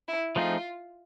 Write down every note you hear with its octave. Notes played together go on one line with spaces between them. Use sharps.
E4
F3 A3 C4 D#4 F4 G#4